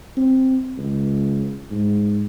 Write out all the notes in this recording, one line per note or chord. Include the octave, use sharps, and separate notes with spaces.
C4
C#2
G#2